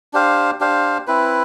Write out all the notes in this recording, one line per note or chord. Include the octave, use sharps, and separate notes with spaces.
D4 G4 C5 F5
D4 G4 C5 F5
C4 E4 B4